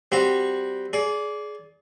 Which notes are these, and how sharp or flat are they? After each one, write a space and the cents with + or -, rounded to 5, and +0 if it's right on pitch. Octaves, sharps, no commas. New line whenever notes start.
G3 +0 C4 +0 F#4 +0
G#4 +20 D5 -20